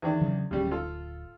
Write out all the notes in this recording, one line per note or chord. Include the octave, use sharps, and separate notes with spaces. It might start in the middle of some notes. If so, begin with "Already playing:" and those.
E2 D#3 D4
C#3 F#3
D1 C#3 G3
F4 A4